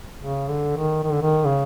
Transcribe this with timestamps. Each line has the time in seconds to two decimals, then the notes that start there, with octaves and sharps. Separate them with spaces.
0.21 C#3
0.49 D3
0.77 D#3
1.04 D#3
1.13 D3
1.22 D#3
1.45 C#3